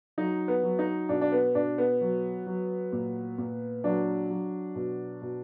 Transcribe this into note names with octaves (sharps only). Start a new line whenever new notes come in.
F#3 D#4
B3
F#3
D#4
B2 D4
D4
B3
B2 D4
B3
F#3
F#3
A#2
A#2
F#3 D4
F#3
B2
B2